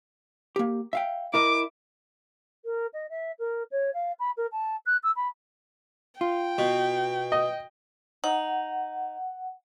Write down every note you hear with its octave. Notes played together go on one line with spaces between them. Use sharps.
A#3 G4
E5 F5 G5
E4 A#4 D#5 D6
A#4
D#5
E5
A#4
C#5
F5
B5
A#4
A5
F#6
E6
B5
F4 G5
B2
D#5
D#4 F#5